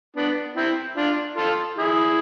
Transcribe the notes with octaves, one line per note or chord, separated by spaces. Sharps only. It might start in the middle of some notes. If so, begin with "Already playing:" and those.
B3 D4
C4 E4
D4 F4
F4 A4
E4 G#4